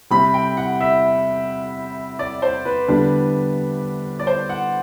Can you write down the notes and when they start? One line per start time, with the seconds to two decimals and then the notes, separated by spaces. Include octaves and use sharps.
0.10 C3 G3 C4 B5
0.34 G5
0.57 F#5
0.81 E5
2.19 D5
2.42 C5
2.65 B4
2.88 D3 G3 B3 D4
4.19 D5
4.27 C5
4.49 F#5